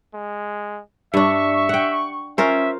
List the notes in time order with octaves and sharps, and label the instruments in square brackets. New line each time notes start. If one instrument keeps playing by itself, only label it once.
[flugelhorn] G#3
[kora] G2 D4 [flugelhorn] E5 [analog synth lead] C#6
[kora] F#5 G5
[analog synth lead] C#4 [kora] F4 A#4 C5 [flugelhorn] E5